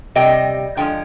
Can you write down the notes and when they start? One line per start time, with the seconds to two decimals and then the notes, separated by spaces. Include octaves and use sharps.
0.15 C3 G3 D#5 G5
0.77 D3 F3 G#3 G5